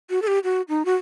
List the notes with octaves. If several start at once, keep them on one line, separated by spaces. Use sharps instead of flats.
F#4
A4
G4
F#4
D#4
F#4